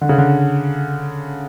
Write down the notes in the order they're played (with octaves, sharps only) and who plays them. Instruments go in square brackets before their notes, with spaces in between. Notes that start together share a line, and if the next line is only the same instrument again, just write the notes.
[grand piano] D3
C#3
D3